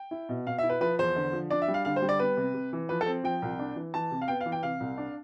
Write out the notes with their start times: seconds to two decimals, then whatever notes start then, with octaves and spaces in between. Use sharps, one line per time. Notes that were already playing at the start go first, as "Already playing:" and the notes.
Already playing: G5
0.11 E4
0.29 B2
0.47 B2 F5
0.58 E5
0.63 E4
0.70 B4
0.81 F3 B4
0.99 E2 C5
1.16 D3
1.33 F3
1.50 D4 D5
1.62 E5
1.68 G3
1.74 F5
1.85 D3 F5
1.96 C5
2.02 G3
2.09 D5
2.19 B3 B4
2.37 C3
2.54 C3
2.73 E3
2.89 F3 B4
3.01 A4
3.06 C4
3.24 F3 G5
3.42 C2
3.59 D4
3.76 E3
3.94 E3 A5
4.11 C3
4.21 F5
4.28 B3 G5
4.41 F5
4.46 E3
4.52 G5
4.63 C3 F5
4.80 C2
4.98 D4